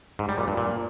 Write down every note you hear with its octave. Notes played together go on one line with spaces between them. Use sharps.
G#2
G3
A#2
G2
A#2